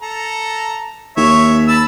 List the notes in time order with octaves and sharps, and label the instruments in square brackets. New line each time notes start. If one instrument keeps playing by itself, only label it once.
[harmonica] A4 A#5
[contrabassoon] D#2 [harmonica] C#5 E5
[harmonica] A5 B5 E6